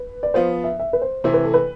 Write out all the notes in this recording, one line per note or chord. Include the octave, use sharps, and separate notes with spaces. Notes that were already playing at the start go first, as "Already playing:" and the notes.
Already playing: B4
D5
F3 B3 F4 C5
E5
E5
B4
C5
C3 E3 A3 E4 C5
B4
A4
B4